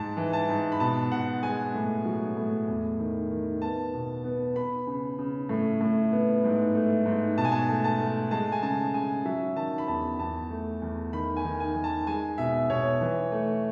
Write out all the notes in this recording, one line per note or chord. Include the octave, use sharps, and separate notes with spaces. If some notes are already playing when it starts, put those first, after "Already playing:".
Already playing: G#2 A5
E3
A5
G#2
B5
B2 A5
B2 F#5
G#3 G#5
A2
F#3
A2
E2
D#3
D#3
B3 A5
B2
B3
B3 B5
C#3
C#3
A2
A2
B3
G#2
A3
G#2
B2 A5
G#5
A5
A3
A5
A3
G#3 A5
G#5
C#3 A5
C#3 G#5
F#3 E5
D#3 A5
B5
E2 A5
E2 A5
A3
E2
D#3 B5
G#5
D#3
G#5
D#3
A5
G#3 G#5
B2 E5
B2 C#5
E3
A3